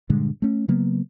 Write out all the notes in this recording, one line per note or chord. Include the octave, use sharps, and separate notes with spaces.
G2 A#2 D3 G#3
A3 C#4
C#3 F#3 A#3 B3